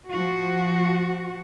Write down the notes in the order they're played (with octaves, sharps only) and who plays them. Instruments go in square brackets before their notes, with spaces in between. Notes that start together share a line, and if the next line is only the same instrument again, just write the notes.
[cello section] F3 F#4